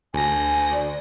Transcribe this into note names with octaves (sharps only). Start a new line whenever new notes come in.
D2 G#5 A#6
D5